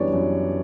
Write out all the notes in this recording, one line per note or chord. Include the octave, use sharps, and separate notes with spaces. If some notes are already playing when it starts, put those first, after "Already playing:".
Already playing: F#2 E3 G3 B3 D4 C#5 D5
F#2